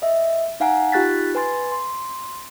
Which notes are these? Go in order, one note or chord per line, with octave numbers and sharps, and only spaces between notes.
D#5 E5
D#4 F5 F#5 G#5 A#5
D#4 F4 G4 F#6 A6 B6
B4 G#5 C6 A6
C6